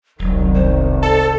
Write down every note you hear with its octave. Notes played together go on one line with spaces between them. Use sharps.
E1 C2 G2 D#3 F#3
C5
A4